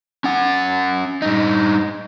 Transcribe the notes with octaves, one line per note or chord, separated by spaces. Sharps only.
C#4 F#5
G2 D#4